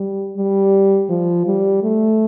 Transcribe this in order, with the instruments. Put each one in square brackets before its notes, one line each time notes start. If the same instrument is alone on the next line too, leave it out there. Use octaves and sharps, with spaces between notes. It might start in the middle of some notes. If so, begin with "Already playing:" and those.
Already playing: [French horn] G3
G3
F3
G3
A3